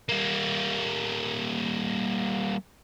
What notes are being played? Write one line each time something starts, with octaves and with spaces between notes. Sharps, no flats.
G3 A#3